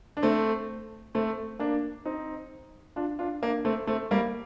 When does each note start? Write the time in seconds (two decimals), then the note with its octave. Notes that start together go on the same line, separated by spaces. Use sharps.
0.17 D4
0.23 A3 C4
1.15 A3 C4
1.59 A#3 D4
2.05 C4 D#4
2.96 D4 F4
3.19 D4 F4
3.43 A#3 D4
3.65 A3 C4
3.87 A3 C4
4.11 G3 A#3